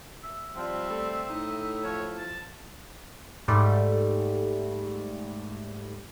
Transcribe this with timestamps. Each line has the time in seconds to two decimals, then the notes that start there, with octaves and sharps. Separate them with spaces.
0.24 E5
0.57 F3 G3 C4
0.90 A3
1.29 A2 D#4
1.84 F3 C#5
2.17 A5
3.48 G#2 G3 A3